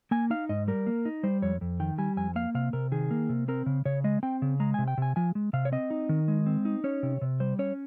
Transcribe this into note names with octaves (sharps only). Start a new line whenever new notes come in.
A#3 G#5
D#4 F5
G#2 D#5
G3 A#4
A#3
D#4
G3 C5
F2 C#5
F2
D#3 G5
G3 G#5
F2 G#5
A#3 F5
C3 F5
C3 A#4
D#3 G#4
A#3
C3
C4 A#4
C#3
C#3 C#5
G#3 D#5
C4 G5
C#3
G#3 A#5
C3 G#5
G5
C3 G#5
F3 G#5
G#3
C3 F5
C#5
C4 D#5
D#4
D#3
G#3
C4
D#4
C#4 C#5
C3
C3
G3 C5
C#4 C#5